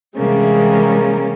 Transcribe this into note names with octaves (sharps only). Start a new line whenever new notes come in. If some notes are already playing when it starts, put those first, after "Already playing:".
C3 E3 G3 G#3 A#3 C#4